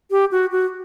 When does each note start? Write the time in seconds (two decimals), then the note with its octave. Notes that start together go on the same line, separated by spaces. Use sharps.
0.11 G4
0.32 F#4
0.51 F#4